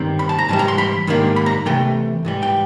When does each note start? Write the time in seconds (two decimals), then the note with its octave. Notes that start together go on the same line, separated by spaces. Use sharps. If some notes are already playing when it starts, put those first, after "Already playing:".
Already playing: G2 D#3 G3 C4
0.19 B5
0.29 A5
0.39 A#5
0.49 G#2 E3 G3 A5
0.59 A#5
0.68 C6
0.78 B5
1.07 G#2 D#3 G3 A#3 D4
1.36 B5
1.46 A#5
1.66 C3 E3 A3 G5
2.25 G#2 E3 G3
2.43 G5